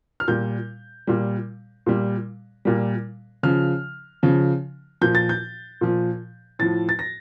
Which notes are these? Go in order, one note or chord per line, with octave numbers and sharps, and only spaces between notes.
F6
A#2 G3 G6
A#2 G3
A#2 G3
A#2 G3
C#3 F3 F6
C#3 F3
A#2 F3 G6
A6
G6
A#2 F3
A2 F3 A6
A6
A#6